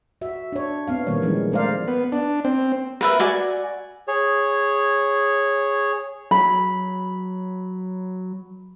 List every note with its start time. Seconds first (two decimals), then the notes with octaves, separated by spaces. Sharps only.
0.21 F#4 E5
0.52 D4 C#5
0.88 B3 C4 F5
1.07 A#2 D#3 G3 A#3 C#5
1.22 E3 F3 G#3 C#4 D#4
1.52 G#3 A3 A#4 C5 D5 F5
1.88 B3
2.12 D4
2.45 C4
3.01 A#4 B4 E5
3.19 F#4 D5 G#5
4.08 G#4 C#5
6.31 F#3 B5